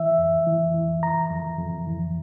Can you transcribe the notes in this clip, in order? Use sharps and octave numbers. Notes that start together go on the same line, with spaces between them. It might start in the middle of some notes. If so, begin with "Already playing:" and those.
Already playing: E3 E5
F2
E3
E3
F2 A#5
F2
F2
E3